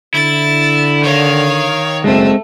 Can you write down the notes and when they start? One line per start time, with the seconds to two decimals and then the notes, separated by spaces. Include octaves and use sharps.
0.14 D3 E4 A6
1.03 D#3 C#5 F5
2.04 F#1 G#3 A3 C4